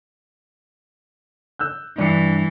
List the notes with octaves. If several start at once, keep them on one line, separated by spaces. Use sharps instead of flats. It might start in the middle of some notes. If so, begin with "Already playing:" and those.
E6 F#6 G6
G2 E3 D4 C#7